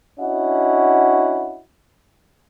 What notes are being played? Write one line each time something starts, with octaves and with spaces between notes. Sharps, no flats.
C#4 D4 E4 F#4 D#5 F#5